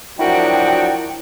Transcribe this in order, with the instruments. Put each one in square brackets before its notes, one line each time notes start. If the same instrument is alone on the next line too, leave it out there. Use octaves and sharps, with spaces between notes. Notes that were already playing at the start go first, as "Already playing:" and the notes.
[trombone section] F3 F#3 D4 [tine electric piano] E4 A#4 [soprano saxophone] F#4 [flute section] G5